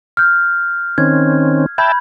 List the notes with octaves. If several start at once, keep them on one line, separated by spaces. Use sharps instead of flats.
F6 G6
D#3 C4 C#4 G#6
E5 G5 A5 B5 G6 G#6